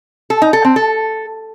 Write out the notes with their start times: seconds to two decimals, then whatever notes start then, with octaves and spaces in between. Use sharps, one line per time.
0.30 A4
0.42 D#4
0.53 A4
0.65 C4
0.76 A4